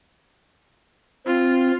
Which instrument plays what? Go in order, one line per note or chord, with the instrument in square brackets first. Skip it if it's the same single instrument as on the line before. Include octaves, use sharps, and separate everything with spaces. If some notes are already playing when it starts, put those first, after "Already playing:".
[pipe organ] C4 [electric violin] F4